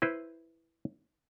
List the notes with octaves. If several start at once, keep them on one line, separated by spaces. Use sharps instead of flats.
E4 B4 C5